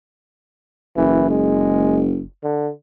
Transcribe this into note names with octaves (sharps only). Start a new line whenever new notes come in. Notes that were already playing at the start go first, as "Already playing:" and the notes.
F#1 E3
G#3
D3